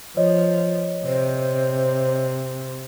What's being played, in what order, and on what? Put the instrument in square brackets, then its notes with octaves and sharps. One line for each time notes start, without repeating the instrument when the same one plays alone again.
[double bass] F3 [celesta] C#5 D#5
[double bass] C3 [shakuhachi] C5